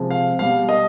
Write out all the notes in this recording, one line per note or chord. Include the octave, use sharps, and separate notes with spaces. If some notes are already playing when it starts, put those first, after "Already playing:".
Already playing: C3 F3 G#3
F5
B2 G3 F5
D#5